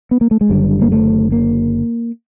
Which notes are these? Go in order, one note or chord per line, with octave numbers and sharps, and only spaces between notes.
B3
A#3
A3
G#3
F#1 F#2 D3 G3
A#3
A3
A#3